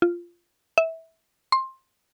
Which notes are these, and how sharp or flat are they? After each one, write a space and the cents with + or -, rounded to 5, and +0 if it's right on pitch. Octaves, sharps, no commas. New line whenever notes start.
F4 -10
E5 -20
C6 +15